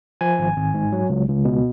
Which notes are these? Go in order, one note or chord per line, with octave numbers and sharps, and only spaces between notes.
F3 G#5
G#1
G#1
G#2
F#3
C#2
C#2
B2